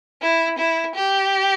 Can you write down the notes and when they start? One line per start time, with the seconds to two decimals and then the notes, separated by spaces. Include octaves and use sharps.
0.22 E4
0.58 E4
0.96 G4